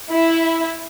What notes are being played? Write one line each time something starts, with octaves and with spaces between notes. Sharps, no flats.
E4